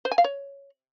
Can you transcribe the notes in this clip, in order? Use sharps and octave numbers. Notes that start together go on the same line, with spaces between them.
C5
G#5
F5
C#5